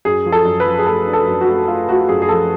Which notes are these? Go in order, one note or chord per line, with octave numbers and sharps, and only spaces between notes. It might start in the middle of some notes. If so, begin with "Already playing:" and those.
F#2 G#4
F3
A4
F#2
B4
F3
G#4
A3 A4
D4
A4
F#2
F#4
A3
A3 F4
A3 F#4
F#2 G#4
G#4
F3 A4